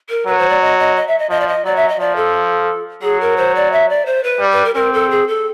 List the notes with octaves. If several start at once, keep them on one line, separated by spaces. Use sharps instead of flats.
A#4
F#3 B4
C5
D5
D#5
D#5
D#5
E5
D#5
F3 D#5
D5
D#5
F#3 D5
E5
D#5
F3 D5
A4
F#3 G#4
A#4
C5
D5
E5
D5
C5
B4
G3
B4
A#4
C4 A#4
A4
G#4
A4